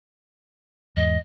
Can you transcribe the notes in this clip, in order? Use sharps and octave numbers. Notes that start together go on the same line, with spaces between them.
E2 G#2 D#5